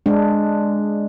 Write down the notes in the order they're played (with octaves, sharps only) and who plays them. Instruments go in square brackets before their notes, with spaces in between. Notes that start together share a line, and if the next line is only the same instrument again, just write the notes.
[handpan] G#3 D4